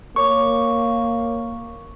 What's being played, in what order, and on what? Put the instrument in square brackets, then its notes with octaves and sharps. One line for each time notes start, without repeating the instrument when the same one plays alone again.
[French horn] A#3 [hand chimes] A#4 C#5 D6 [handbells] C#6